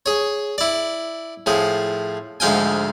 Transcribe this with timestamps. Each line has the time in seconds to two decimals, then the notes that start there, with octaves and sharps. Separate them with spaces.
0.06 G#4 C#5
0.58 E4 D5
1.46 A2 F3 G#4
2.40 D2 G#2 F3 F5 G5 G#5